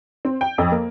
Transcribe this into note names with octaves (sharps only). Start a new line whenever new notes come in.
C4
G5
F2
A#3